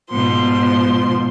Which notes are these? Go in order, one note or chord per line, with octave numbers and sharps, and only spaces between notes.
G#2 B2 F3 C6